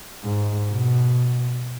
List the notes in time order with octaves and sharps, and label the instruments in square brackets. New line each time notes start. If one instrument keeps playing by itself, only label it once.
[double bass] G#2
B2